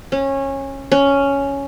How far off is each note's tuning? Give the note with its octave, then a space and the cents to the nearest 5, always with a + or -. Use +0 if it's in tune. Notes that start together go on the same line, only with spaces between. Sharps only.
C#4 -20
C#4 +5